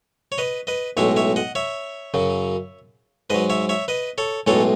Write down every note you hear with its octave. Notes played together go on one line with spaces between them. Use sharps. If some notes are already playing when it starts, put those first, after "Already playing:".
C#5
B4 D#5
B4 D#5
B1 A2 G#3 C#5 E5
C#5 E5
D#5 F#5
C#5 E5
F#2 C#3 F#3
G#2 F#3 B4 D#5
C#5 E5
C#5 E5
B4 D#5
A4 C#5
B1 A2 E3 G#3 A4 C#5